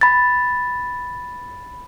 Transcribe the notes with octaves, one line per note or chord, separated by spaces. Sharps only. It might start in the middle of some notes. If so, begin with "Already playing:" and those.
B5 A6